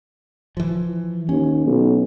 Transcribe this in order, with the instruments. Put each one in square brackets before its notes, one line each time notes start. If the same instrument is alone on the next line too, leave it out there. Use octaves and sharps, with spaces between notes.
[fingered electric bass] E3 F3
[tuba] D#2 [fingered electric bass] C#4
[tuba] B1